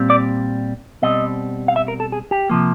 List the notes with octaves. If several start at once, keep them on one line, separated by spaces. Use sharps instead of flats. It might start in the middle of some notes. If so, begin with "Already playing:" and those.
Already playing: A#2 G3 C4
D5
B2 G3 C4 D#5
F5
E5
A#4
A4
G#4
G4
C3 F3 A#3